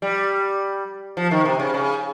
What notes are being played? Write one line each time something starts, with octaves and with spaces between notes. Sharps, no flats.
G3
F3
D#3
C3
C#3
C#3